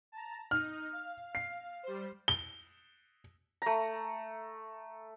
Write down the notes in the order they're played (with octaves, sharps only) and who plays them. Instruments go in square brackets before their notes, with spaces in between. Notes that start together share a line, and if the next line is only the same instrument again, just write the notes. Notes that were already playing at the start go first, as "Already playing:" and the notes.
[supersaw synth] A5 A#5
[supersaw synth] D#4 [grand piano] F6
[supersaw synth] F5
[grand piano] C7
[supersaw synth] G3 C5
[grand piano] G7
[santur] A3 A#5